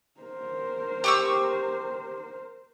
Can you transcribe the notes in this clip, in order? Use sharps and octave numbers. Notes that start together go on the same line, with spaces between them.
A#4 C5
G4 C#6 E6